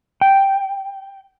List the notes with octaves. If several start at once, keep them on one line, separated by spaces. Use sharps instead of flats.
G5